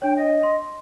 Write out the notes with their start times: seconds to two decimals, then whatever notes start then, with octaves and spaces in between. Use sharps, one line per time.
0.02 D4 C#5 G5
0.16 D#5
0.43 C6